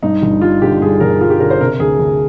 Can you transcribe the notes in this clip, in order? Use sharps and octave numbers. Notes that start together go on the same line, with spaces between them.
G2 D#4
G1
G3 F4
D3 G4
G2 G#4
G1 A#4
G3 F4
G4
D3 A#4
C5
C3 A#4
D2 G#4
D2